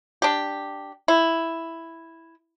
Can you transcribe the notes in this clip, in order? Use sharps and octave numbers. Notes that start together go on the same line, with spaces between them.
D4 G4
E4